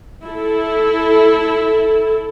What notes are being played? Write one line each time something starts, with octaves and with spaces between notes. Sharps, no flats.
E4 A4